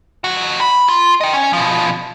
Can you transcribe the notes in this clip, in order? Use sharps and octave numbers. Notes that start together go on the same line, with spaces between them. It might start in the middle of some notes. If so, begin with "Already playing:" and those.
F2 F#4
B5
F4
D#5 G5
C#4
B2 F3